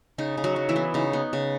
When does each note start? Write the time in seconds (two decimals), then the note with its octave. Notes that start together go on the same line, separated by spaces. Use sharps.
0.18 C#3 D#4
0.37 C#3
0.44 F#3 F#4
0.56 F#3
0.69 E3 E4
0.76 B3
0.94 C#3 D#4
1.13 B3
1.33 C#3